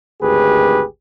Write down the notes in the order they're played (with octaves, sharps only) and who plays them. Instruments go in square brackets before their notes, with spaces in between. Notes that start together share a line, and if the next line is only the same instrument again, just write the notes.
[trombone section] G#1 D2 G4 G#4 B4